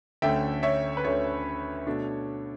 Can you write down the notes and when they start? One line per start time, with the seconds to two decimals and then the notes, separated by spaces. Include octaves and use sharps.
0.22 D2 D3 A3 C#4 E5 G5
0.63 C#5 E5
0.97 B4
1.04 D2 D3 A3 C#4 C#5
1.86 B2 A3 D4